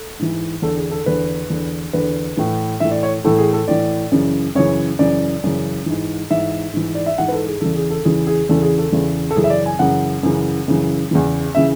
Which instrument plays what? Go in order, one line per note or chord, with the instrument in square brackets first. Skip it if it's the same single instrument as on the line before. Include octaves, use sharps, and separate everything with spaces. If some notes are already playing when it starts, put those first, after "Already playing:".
Already playing: [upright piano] A4
G#2 E3
E2 D3 A4
G#4
A4
E2 D3 B4
E2 D3
E2 D3 B4
A2 E3
A2 E3 E5
D5
C#5
A2 E3 A4
G#4
A4
A2 E3 D5
F#2 C#3 E3
F#2 C#3 E3 C#5
F#2 C#3 E3 D5
F#2 C#3 E3
G#2 E3
G#2 E3 E5
G#2 E3
D5
E5
G#2 E3 F#5
B4
A4
G#4
E2 C#3 E3 A4
G#4
A4
E2 C#3 E3 G#4
G#4
E2 C#3 E3 A4
G#4
A4
E2 C#3 E3
A4
F#2 C#3 E3 G#4
E5
D5
G#5
F#2 C#3 E3 F#5
F#2 C#3 E3
F#2 C#3 E3
E2 C#3 E3
C#3 E3 E5